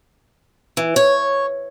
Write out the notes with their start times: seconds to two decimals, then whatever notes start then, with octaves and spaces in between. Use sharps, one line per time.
0.77 E3
0.96 C#5